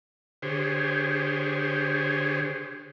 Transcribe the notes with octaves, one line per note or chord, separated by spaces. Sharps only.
D3 G4 G#4 C5 C#5